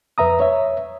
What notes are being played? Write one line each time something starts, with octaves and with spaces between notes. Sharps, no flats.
F2 B4 E5 A#5 D#6
C#5 E5